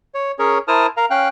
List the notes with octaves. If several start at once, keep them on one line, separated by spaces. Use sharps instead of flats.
C#5
C#4 G#4 A#4 C#5
E4 A#4 C5 A5 D#6 F6
A#4 F5 A#5
C#4 F5 G5 F#6